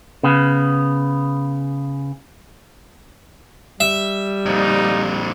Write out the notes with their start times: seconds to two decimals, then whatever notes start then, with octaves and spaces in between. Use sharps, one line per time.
0.23 C#3 B3
3.80 G3 E5
4.46 F2 A#2 D#4